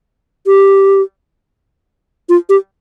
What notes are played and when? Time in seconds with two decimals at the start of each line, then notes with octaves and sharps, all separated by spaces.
0.47 G4
2.29 F4
2.49 G4